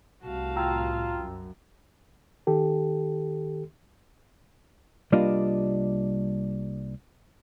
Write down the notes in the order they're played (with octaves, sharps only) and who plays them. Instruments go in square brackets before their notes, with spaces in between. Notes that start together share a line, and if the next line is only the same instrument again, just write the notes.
[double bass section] C2 A2 [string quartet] F#4 F5 A5
[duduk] F4 [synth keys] G5 A#5 E6
[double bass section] F#2
[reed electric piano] D#3 G4 A4
[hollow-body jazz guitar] C2 G3 A#3 D4 F4 D#5